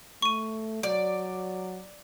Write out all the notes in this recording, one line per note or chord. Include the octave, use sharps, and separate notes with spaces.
A3 C#6 D#7
F#3 D5